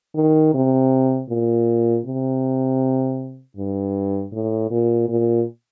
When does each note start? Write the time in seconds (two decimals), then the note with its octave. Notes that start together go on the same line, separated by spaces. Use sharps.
0.15 D#3
0.54 C3
1.30 A#2
2.06 C3
3.57 G2
4.33 A2
4.70 A#2
5.09 A#2